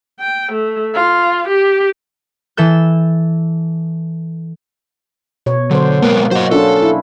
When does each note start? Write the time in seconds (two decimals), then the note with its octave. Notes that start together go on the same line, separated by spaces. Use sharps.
0.20 G5
0.52 A3
0.94 F4
1.48 G4
2.57 E3 A4 E6 G6
5.46 B2 C#5
5.71 D3 F#3 C5
6.02 G#3 A#3 B3 A#4
6.31 F#3 F#4 C5 D#5
6.51 C#4 D4 F4 A4
6.83 E4